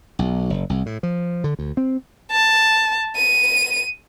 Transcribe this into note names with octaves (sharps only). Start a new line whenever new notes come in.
B1
F#1
C2
A2
F3
D3
D2
C4
A5
D#7